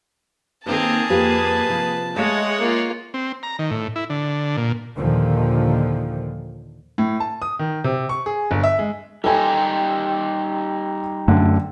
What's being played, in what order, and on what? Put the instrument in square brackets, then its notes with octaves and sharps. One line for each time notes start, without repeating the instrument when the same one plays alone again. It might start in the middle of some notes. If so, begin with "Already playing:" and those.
[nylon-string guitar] D#3 D#4 B4 [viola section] A#3 G#4 [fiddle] C4 A#5 [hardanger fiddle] A5
[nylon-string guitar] F2 F4 G4 [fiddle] B4
[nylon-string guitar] C3 F3
[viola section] G#3 [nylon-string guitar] A3 F5 [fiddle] C#5 F#5
[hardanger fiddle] A#3 F4
[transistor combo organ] C4
A#5
D#3
A2
E4
D3
A#2
[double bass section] D#2 A#2 D3 D#3 F3
[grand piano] A2
A5
D#6
D#3
C3
C#6
G#4
G1
E5
G#3
[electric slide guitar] G3 D#4 G4 [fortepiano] A4 G#5 [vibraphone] G5 C6
[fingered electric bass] F#2 A3 [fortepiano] D3